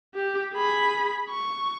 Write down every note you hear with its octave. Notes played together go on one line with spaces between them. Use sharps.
G4
G#4 B5
C#6